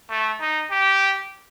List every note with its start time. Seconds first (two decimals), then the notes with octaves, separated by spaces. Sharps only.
0.10 A3
0.41 D#4
0.71 G4